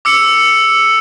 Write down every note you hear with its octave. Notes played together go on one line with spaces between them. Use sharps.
D6 E6 C#7